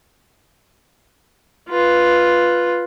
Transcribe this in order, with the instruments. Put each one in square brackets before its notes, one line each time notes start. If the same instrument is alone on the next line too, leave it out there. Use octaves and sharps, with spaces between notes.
[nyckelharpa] F4 B4